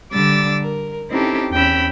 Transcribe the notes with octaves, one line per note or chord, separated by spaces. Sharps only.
D3 G3 D6 E6 A6
A#4
C4 C#4 D#4 E4 G4 A4
E2 C4 C#4 G5 B5 E6